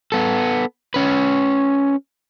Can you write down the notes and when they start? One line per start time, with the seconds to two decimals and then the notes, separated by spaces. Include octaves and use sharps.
0.12 B3 A4
0.94 C#4 B4